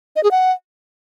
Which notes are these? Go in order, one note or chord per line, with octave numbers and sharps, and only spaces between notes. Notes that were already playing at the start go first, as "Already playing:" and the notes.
D#5
G#4
F#5